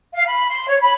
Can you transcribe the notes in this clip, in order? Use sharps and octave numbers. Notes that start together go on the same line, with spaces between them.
F5
B5
C6
C#5
B5